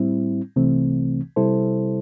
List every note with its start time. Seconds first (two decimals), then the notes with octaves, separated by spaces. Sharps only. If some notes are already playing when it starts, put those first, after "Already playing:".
Already playing: A2 G3 C4 E4
0.56 C2 C3 E3 A3 C4
1.36 C3 G3 E4 A4 C5